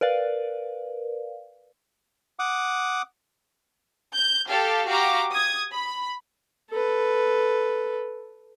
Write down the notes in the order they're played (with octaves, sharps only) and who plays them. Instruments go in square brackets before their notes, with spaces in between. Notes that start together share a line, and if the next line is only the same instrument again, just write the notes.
[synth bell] A#4 B4 D5 F5
[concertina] F#5 D6 D#6
[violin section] G6
G4 A4 F5
F#4 G4 F5 A#5 D6
D#6 G#6
B5
[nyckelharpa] A4 B4